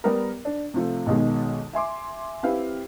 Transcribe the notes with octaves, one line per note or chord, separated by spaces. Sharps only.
G3 B3 A#4
D4
C3 F3 A3
B1 B2 D#3 G#3
E5 G#5 C6 D6
C4 E4 G4 B4 F5